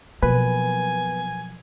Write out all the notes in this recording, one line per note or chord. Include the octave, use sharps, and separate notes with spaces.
B2 F3 F#3 A#3 B4 G#5